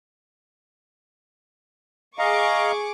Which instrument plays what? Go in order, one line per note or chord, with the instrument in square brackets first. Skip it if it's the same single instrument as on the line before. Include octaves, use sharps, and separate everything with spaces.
[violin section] G#4 C#6 D6 [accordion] D#5 F5 A#5